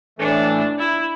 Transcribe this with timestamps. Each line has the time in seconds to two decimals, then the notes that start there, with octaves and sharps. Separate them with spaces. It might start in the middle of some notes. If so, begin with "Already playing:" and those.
0.19 A2 E3 A3 D4
0.79 E4